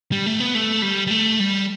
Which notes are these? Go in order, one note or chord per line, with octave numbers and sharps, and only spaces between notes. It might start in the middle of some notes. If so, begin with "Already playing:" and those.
G3
A3
B3
A3
G3
G3
A3
G3